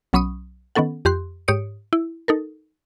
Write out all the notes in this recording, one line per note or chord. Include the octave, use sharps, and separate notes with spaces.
B1 F#3 C#4 B5 C#6 D#6
D#3 B3 C#4 A4 F#5
F2 G4 C6 F#6
G#2 G4 C#5 D#6 C#7 D7
E4
D#4 A4 A#4